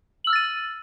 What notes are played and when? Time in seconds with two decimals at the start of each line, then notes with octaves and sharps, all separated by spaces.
0.24 F#7
0.27 E6
0.30 F6
0.33 A6
0.35 D#7